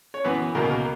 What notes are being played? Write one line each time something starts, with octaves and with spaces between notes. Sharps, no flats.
C#5
F#2 E3 B3 B4
C#2 B2 A#3 A#4
A#4